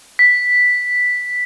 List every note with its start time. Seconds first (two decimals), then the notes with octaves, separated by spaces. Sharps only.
0.19 B6